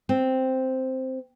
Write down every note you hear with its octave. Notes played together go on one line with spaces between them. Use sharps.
C4